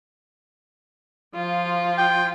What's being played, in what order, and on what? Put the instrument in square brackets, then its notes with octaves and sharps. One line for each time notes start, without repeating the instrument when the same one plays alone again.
[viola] F3 F4
[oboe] G5